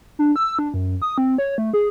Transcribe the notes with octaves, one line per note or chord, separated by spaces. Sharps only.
D4
E6
D4
F#2
D#6
C4
C#5
A3
G#4